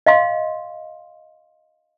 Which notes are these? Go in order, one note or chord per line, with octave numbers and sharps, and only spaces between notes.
D#5 F5 C6